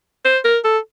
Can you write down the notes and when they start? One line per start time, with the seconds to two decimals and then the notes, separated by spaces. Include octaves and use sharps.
0.25 C5
0.44 A#4
0.64 A4